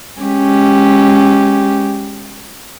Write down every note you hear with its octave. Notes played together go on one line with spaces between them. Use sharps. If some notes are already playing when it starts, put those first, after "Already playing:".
G#3 C#4 G4